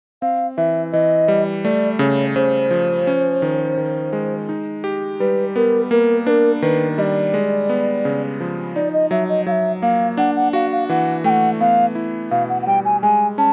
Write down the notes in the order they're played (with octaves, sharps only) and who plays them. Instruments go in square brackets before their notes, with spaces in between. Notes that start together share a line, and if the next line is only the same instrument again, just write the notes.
[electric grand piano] C4 [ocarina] F5
[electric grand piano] E3 [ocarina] E5
[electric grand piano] E3 [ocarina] D#5
[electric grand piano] G3
[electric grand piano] A3 [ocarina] D5
[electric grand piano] C#3 [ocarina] C#5
[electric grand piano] C#3 [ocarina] C5
[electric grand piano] F3
C#4
D#3
D#3
G#3
D#4
G4
[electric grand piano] G3 [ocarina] B4
[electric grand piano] B3 [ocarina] A#4
[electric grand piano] A#3 [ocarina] A#4
[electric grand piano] D4 [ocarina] A#4 B4
[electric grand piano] D#3 [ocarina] B4
[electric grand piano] G3 [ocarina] D5 D#5
[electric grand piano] G#3
B3
C#3
F3
[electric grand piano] D#4 [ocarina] D5
[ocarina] D#5
[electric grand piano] F#3 [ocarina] E5
[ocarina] D#5
[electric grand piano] F#3 [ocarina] F5
[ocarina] E5
[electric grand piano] A#3 [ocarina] F5
[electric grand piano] D4 [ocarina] F#5
[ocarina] F#5
[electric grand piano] F#4 [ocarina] F5
[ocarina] F5
[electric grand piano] E3 [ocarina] F#5
[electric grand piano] A3 [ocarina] G5
[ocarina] F#5
[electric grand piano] B3 [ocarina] F5
[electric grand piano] E4
[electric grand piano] B2 [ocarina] F5
[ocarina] F#5
F#5
[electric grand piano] G3 [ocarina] G5
[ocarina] G#5
[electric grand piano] G#3 [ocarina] G#5
[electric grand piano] C#4 [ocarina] A5